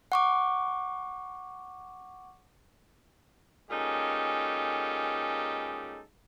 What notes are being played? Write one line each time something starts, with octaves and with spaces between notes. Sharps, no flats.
F#5 C#6 D6
A#2 G#3 C#4 D#4 G4 A4